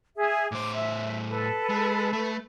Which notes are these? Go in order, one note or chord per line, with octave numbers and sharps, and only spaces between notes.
G#4 E5
A2 C5 D6
E5
A4 B4
G#3
A3